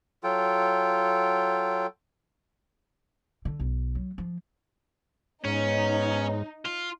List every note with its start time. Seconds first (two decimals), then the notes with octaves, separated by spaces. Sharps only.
0.24 F#3 F4 A4 G5
3.45 D3
3.60 B1
3.95 F#3
4.18 F3
5.45 G#2 B3 C#4 D#4 C#5
6.65 F4